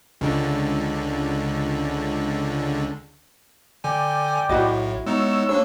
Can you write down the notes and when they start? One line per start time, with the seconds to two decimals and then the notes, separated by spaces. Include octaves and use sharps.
0.21 C#2 D3
3.84 D3 D5 G5 G#5
4.49 B1 A2 E4 F#4 D#5
5.06 G#3 B3 D#4 C#5 E6
5.49 A#3 D4 C#5 E6